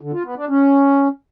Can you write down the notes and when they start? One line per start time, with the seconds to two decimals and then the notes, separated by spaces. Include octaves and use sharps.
0.01 D3
0.13 F4
0.25 B3
0.37 D4
0.49 C#4